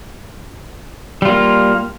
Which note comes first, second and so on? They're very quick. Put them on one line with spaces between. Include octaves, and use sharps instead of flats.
G3 F4 A#3